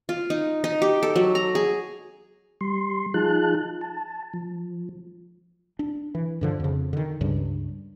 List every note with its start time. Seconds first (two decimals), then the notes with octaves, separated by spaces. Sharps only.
0.09 F4
0.30 D#4
0.64 D#4
0.82 G4
1.03 A4
1.16 F#3
1.35 A#5
1.55 G#4
2.61 G3 C6
3.14 F3 D#4 F4 G#4 A5 F#6
3.81 A5
4.34 F3
5.79 D4
6.15 E3
6.41 G2 D3 F3
6.60 F2 C#3
6.93 D3 D#3
7.21 C#2 G2 C#3 G3